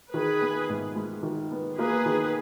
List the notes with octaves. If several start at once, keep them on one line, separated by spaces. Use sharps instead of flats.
D#3 G#4 B4
B3
G#2
G#3
D#3
B3
A#3 G#4 B4
D#3